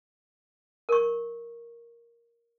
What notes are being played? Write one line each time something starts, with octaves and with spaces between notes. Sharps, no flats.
A#4 C#6